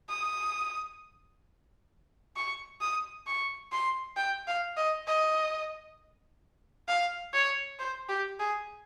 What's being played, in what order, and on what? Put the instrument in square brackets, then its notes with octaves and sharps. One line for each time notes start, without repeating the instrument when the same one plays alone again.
[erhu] D#6
C#6
D#6
C#6
C6
G5
F5
D#5
D#5
F5
C#5
C5
G4
G#4